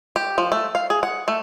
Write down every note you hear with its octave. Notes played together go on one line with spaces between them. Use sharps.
G4
F3
A3
F5
G#4
F#5
A3